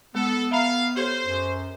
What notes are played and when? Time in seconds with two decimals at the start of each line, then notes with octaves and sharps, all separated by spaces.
0.15 G#3 B3 A4
0.51 E5 F5 A#5 B5
0.96 G4 A4 C5 C#5
1.26 F#2